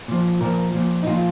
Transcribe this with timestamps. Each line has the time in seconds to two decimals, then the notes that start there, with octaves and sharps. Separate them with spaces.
0.08 A#2 F3
0.41 A#2 F3 A#4
0.74 A#2 F3
1.03 D#4
1.07 A#2 F3 F4